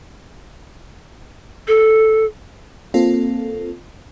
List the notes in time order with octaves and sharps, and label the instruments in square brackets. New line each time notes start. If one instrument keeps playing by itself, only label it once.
[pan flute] A4
[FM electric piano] A#3 C4 F4 A4